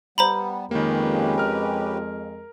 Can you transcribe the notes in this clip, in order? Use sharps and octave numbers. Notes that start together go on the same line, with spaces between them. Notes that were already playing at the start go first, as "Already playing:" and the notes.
G3 B3 C5 A#5 B5
F2 D#3 G#3 A#3 C#4 G4 B4
A#4 F6